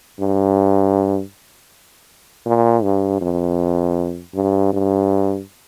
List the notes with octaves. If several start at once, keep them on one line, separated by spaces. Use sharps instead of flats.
G2
A#2
G2
F2
G2
G2